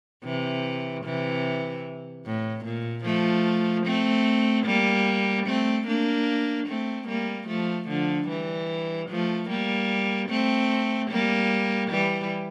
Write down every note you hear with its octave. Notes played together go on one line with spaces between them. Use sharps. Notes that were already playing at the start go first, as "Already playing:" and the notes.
C3 E3
C3 E3
A2
A#2
F3 A3
A3 C4
G3 A#3
A3 C4
A#3 D4
A3 C4
G3 A#3
F3 A3
D3 F3
E3 G3
F3 A3
G3 A#3
A3 C4
G3 A#3
E3 G3